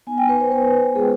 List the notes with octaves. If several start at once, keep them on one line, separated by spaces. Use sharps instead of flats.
B3 D#4 G#5
G5
B4
C5
B4
G#3 B3 F4 G#4